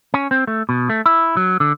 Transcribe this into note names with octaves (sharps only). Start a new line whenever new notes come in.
C#4
C4
A3
B2
A3
E4
F#3
D3